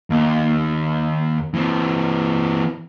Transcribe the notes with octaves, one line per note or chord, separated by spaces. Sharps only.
D#2
E3 C4